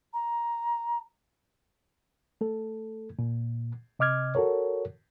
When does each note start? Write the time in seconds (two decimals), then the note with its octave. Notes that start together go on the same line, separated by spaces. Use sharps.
0.13 A#5
2.41 A3 A4
3.19 A#2
3.99 C3 D#5 D6 F6 G#6
4.35 F#4 A4 A#4 C#5